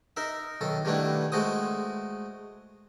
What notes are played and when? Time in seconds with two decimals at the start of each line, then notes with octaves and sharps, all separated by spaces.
0.17 D#4 A#4 E5
0.61 B1 D#3 A4
0.85 D#3 G3 A3 B3 D4 E4
1.32 G#3 A3 F#4 C5 D#6